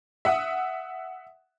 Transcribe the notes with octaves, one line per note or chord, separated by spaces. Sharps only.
E5 F#5 D#6